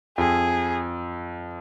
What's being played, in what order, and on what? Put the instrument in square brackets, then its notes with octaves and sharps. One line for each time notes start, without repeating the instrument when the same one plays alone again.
[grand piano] F2 [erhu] G#4